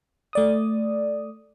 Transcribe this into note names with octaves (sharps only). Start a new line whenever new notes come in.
A3 D5 D#6